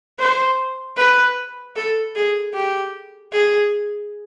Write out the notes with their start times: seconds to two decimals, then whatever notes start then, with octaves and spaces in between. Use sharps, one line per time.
0.19 C5
0.97 B4
1.76 A4
2.16 G#4
2.54 G4
3.33 G#4